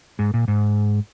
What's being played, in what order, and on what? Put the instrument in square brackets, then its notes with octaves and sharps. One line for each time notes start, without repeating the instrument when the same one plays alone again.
[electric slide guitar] G#2
A#2
G#2